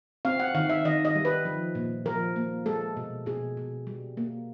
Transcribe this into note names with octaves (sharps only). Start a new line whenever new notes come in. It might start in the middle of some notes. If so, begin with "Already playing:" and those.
C4 F5
F#5
D#3 F5
E5
D#3 D#5
D#5
G3
B4
F3
A#2
F3 A#4
A#3
G#3 A4
B2
B2 G#4
B2
G3
A#3